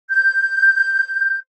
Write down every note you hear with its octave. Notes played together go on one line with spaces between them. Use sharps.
G6